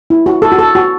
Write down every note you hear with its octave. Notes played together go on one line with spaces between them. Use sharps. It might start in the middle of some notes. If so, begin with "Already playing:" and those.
E4
F#4
A4
F#4
A4
F#4